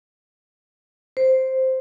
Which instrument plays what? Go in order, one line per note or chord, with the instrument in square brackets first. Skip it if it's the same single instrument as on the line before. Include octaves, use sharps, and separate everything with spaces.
[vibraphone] C5